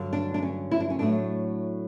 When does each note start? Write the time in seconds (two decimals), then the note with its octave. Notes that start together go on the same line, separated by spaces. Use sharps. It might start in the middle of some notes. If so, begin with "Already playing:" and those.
Already playing: G2 D3 F#3
0.13 D4
0.34 D4
0.42 C#4
0.71 E4
0.80 D4
0.90 C#4
0.99 A2 F#3 A3 D4